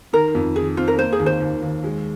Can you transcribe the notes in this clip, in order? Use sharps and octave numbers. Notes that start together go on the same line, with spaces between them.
D#3 A#4
F2
D#3 G#4
C4 F4
A#4
A#3 C5
G#4
D#2
C5
D#2
D#2
G#3